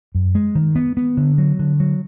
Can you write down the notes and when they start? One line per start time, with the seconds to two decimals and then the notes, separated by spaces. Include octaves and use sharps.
0.15 F#2
0.35 G#3
0.55 D#3
0.75 B3
0.97 B3
1.17 D3
1.38 F#3
1.59 D3
1.80 F#3